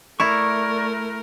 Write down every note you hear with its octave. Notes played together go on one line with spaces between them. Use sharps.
A3 E4 A#4 D5 A#5 C#6